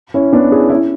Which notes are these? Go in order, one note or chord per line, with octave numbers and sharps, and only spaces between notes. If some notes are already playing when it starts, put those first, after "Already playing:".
C#4 E4
B3 D4
E4 G#4
C#4 E4